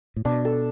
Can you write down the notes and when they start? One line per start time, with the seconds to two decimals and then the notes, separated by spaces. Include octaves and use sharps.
0.16 A2
0.25 B2 D4
0.45 A4